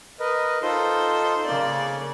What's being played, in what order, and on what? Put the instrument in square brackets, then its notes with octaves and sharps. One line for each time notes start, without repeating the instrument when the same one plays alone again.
[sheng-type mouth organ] A#4 B4 D#5
[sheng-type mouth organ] D#4 F4 A4 [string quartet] C5
[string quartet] C#3 D5 [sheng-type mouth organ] A#3